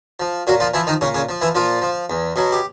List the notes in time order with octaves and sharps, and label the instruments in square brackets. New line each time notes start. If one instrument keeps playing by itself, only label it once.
[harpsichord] F3
A#2 F#3 F#4
F3 F4
E3 F3 E4
D#3 D#4
A#2 C#3 C#4
C#3 C#4
F3
E3 E4
A#2 F3 F4
F3
E2
B2 F#3
G4